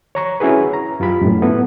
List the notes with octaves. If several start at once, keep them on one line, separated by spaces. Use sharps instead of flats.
C#5 A#5 C#6
C#4 E4 F#4 G#4 B4
A#5
F#2 F4 G4 B5
F#2 A2
B3 E4 A4 B4